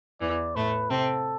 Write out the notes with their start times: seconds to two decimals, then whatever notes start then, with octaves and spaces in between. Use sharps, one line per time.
0.21 E2 E3 D5
0.56 A2 A3 B4
0.90 C3 C4 A4